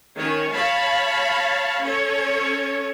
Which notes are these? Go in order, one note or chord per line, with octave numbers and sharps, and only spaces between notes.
D#3 C#4 C#5
C#5 F5 A5 B5
C#4 A4 C#5